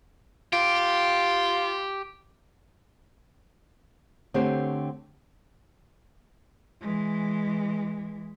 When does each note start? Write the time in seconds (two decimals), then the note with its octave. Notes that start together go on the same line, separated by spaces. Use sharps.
0.53 F4 G4
4.34 D3 A3 C4 G4 C5 C#5
6.81 E3 G#3